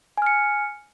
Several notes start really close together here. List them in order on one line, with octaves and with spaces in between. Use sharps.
G#5 F6 C#7